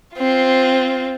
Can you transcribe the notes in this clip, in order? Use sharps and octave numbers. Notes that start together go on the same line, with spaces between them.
C4 F4